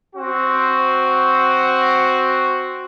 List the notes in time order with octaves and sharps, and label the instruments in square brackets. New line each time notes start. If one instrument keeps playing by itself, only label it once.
[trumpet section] C4 F#4